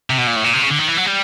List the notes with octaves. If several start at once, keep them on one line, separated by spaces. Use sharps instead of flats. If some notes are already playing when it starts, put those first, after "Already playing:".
C3
B2
A#2
A2
A#2
C3
C#3
D3
D#3
E3
F#3
G3